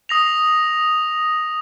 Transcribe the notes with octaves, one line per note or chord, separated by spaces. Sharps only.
D#6 A#6 F7